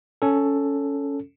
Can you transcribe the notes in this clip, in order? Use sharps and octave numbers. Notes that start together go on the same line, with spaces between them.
C#4 A4